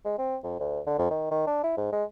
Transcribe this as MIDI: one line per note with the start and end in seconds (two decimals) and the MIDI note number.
0.05 0.14 56
0.18 0.36 60
0.44 0.59 41
0.60 0.80 38
0.86 0.97 50
0.98 1.09 41
1.10 1.27 51
1.31 1.44 51
1.47 1.61 62
1.64 1.75 64
1.77 1.90 44
1.92 2.04 56